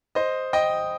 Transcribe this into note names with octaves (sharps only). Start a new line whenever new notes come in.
C5 D#5
D#5 G5